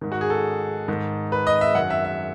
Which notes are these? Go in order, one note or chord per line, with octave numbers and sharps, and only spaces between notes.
G#2 D#3
F#4
G#4
A4
G#2 D#3
B4
D#5
E5
F#2 D#3 F#5
E5
E5